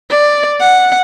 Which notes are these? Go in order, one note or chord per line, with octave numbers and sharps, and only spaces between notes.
D5
F#5